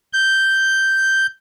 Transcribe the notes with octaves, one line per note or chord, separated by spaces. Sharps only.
G6